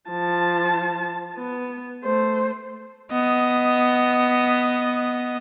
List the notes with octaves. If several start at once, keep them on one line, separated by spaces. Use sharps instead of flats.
F3 A5
B3
A3 C5
B3 D#5